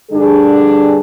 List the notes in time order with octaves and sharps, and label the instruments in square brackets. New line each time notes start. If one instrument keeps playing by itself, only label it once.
[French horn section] G2 D3 G3 D4 G#4